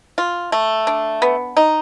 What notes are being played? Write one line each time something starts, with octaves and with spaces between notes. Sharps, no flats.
F4
A3
D4
B3
D#4